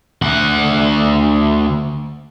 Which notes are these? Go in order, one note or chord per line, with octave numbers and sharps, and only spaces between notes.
D2 F#5